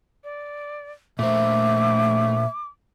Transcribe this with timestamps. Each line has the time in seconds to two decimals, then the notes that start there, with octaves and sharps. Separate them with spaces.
0.24 D5
1.19 A#2 A3 C5 E5 D6